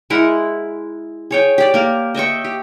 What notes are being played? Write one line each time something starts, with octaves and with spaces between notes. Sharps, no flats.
G#3 E4 A#4 F#5
G#4 C#5 G5
G4 D5
A#3 A#4
D#5 E5 G5 C#6
G4